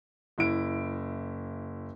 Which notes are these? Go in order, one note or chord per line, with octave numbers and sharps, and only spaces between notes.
F#1 E4 D7